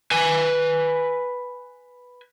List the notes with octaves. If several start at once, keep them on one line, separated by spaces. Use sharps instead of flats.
B4 G#5